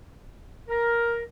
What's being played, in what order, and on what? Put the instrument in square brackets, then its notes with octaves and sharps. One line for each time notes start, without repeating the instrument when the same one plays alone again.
[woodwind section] A#4